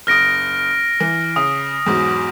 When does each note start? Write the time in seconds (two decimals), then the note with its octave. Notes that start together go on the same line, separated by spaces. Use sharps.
0.07 F#1 D#6 F6 A#6 D7
1.00 E3
1.36 C#3 D#6
1.86 E2 G#2 F#3